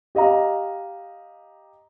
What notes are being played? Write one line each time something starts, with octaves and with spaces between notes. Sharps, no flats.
G4 D#5 F5 A#5